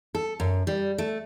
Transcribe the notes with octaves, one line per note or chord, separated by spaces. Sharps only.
A4
F#2
G3
A3